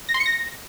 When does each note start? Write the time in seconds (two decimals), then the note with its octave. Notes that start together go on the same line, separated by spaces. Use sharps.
0.09 A#6
0.14 C6
0.20 C#7
0.26 A#6